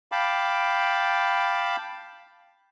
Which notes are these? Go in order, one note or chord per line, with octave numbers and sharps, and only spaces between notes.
F5 G5 A5 B5 D6